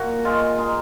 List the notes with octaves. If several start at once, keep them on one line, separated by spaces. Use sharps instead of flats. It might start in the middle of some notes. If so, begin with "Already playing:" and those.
Already playing: A#2 F#4
G#3 F4
G#3 D#4